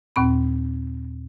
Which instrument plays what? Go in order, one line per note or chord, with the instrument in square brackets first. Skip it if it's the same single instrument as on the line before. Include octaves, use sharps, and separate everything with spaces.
[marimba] D#2 A#2 C4 B5